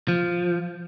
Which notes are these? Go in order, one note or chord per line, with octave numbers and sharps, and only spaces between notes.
F3